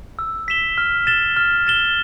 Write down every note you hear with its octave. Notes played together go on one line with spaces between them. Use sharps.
E6
B6 E7 G7
F6
A6 E7 G7
F6
A6 E7 G7